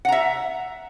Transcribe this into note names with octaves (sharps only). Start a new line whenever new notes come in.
E5 F#5 A#5